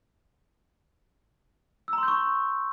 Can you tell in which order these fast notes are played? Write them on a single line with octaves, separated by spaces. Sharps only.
E6 A#5 C6 G6 C#6